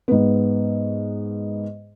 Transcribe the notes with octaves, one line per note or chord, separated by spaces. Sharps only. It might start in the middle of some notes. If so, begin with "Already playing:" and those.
G#2 B3